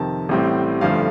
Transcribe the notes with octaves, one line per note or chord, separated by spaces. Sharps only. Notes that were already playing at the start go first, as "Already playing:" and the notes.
Already playing: F2 C3 D#3 A5
A1 A2 G3 C4
G1 G2 F3 A3 F5